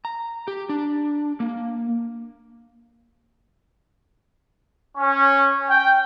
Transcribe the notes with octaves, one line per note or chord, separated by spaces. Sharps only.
A#5
G4
D4
A#3
C#4
G5